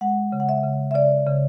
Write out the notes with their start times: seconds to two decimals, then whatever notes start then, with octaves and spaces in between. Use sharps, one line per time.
0.01 G#3 F#5
0.32 C#3
0.40 F#5
0.49 E5
0.64 C#3
0.91 E5
0.95 C#3 D5
1.27 C#3